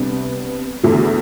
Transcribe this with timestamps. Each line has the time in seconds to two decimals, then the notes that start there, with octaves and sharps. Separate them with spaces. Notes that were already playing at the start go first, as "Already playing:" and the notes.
Already playing: C3 G3 B3 D4
0.83 E2 D3 F#3 A3 E4